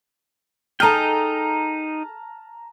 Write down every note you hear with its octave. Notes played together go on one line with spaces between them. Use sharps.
D#4 G#4 A4 D#5 G5 A5 A#5 F6